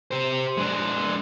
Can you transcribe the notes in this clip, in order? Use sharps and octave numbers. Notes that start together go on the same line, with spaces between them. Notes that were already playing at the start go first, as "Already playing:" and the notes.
G4 C5
G#3 D4